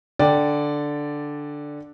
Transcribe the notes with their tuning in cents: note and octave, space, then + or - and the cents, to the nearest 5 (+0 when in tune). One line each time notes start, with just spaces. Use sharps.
D3 +0 D5 +0 G5 +0